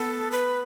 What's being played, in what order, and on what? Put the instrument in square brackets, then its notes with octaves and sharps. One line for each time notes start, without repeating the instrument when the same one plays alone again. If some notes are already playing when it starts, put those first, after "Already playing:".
Already playing: [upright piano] B3 [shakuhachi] A4
[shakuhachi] B4